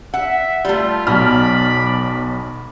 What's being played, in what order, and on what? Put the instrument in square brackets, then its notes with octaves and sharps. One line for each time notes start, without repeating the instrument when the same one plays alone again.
[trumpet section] E5 [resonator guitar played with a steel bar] F#5
[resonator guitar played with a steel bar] G3 A3 [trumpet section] F4
[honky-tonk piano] B1 F6 [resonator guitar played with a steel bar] B2 [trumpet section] D5 B5